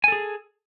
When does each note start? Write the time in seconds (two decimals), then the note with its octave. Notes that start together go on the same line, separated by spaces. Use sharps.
0.04 G#5
0.08 A4
0.12 G#4